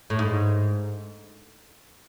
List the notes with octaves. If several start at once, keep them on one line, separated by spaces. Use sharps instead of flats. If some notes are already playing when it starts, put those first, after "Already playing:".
A2
G#2